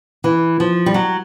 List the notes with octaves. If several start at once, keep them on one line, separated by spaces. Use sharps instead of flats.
E3
F3
G3
F#3